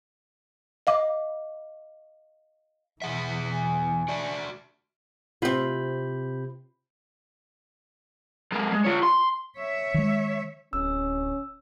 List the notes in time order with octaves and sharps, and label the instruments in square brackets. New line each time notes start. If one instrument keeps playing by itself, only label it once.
[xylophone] D#5 F5 D6
[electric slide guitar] E2 G#4 E5 [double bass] B2 E3 [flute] F#5
[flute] G#5
[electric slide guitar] F#4 D5 E5
[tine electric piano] C3 B5 G6 [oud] C4 F4
[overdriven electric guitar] G#3 A#3
G#3
F4 C#5
C6
[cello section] C#5 E5
[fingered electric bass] D#3 G#3
[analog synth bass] D1 [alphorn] C#4 [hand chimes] E6